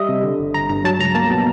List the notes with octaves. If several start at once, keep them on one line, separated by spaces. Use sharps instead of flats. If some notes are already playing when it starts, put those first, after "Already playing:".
Already playing: G3 D#5 E5
C3
D3
G1
G1 A#5
G2 A#5
F#3 A5
C#2 A#5
A#3 A5
B2